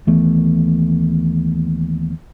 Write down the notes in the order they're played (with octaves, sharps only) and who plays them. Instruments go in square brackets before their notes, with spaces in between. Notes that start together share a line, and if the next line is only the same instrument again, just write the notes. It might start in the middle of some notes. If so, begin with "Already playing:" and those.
[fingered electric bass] D#2 E3 A3 B3